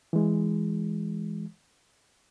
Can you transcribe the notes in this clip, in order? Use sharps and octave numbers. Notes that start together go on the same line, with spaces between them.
E3 G#3